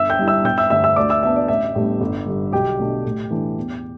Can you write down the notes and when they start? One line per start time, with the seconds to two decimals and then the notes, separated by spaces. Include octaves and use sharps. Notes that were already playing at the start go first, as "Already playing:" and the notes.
Already playing: G1 E5 E6
0.10 G5 G6
0.19 G2 G3 E4
0.27 E5 E6
0.45 G1 G5 G6
0.58 E5 E6
0.70 G2 D3 A3 E5 E6
0.84 E5 E6
0.96 D2 D5 D6
1.10 E5 E6
1.23 D3 B3 D4 E5
1.36 D5
1.48 A1 E5
1.75 A2 G3 B3 D4
2.01 G1
2.26 G2 D3 G3
2.52 B1 G4 G5
2.79 B2 A3 D4
3.05 A2
3.31 E3 A3 D4
3.57 E2